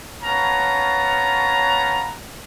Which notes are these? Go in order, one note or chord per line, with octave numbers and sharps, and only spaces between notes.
B3 C#4 C#5 F5 A5 A#5